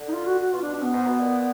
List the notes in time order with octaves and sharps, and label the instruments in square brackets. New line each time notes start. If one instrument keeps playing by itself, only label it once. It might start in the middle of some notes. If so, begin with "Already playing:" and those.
Already playing: [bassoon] D3
[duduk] D#4
F4
F#4
F#4
[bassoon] B2 [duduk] F4
[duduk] D4
D4
B3
[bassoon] G#2
B2
A#2